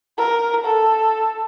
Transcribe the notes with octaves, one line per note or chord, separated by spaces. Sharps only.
A#4
A4